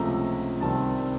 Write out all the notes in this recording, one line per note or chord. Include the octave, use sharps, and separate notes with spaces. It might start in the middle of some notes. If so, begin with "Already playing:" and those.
Already playing: C#2 C3 F3 A3 A#5
C2 C3 D#3 G3 C4 A5